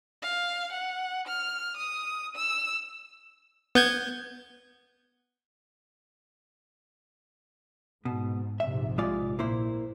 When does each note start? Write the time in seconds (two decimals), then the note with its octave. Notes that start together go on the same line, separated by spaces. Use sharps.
0.22 F5
0.72 F#5
1.27 F6
1.77 D#6
2.36 E6
3.75 B3 G6 G#6
8.05 G#2 B2
8.60 A#1 G#2 C3 E5
8.98 G#3 F4 D5
9.39 A#2 A#3 E4 C5